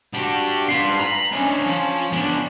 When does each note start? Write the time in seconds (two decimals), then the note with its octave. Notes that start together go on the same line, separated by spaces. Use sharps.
0.14 D4 F#4 G4
0.69 D4 F4 B4 C7
1.00 A#5 B5
1.32 C#4 D4 E4
1.66 F3
2.13 B3 D4